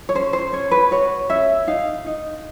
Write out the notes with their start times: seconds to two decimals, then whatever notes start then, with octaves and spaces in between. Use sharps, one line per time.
0.09 C#5
0.15 C#4 C5
0.33 C5
0.53 C#4 C#5
0.71 B4
0.91 F#4 C#5
1.30 C#4 E5
1.67 D#4 F5
2.06 D#4